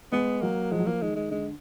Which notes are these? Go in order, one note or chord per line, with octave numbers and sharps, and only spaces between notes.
G#3 B3
F#3 A#3
F3 G#3
F#3
F3 A#3
D#3 G#3
G#3
D3 G#3